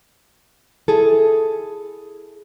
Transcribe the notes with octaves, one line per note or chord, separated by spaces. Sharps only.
E4 G#4 A4